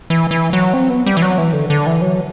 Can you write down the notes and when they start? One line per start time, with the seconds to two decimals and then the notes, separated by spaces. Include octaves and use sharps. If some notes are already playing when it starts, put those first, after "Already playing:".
0.10 E3
0.31 E3
0.53 F#3
0.74 C4
0.90 B3
1.07 G3
1.17 E3
1.22 F#3
1.38 E3
1.53 D3
1.70 D3
1.87 E3
2.02 F#3